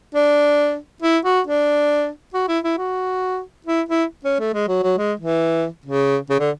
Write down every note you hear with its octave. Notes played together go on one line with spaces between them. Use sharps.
D4
E4
F#4
D4
F#4
E4
E4
F#4
E4
E4
C#4
A3
G#3
F#3
F#3
G#3
E3
C#3
C#3
D3